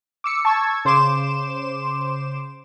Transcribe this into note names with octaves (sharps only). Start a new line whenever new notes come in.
D6 E6 C#7
A5 C#6 E6 G#6
C#3 C5 C6 D6 E7